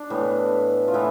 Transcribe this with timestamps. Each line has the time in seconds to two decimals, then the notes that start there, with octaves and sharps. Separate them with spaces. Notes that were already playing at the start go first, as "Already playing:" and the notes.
Already playing: D4
0.10 A2 E3 B3
0.88 F4
0.94 A2 E3 B3 E4